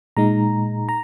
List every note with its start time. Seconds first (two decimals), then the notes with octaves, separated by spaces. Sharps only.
0.16 A#2 G#3 D#4 A#5
0.89 A#5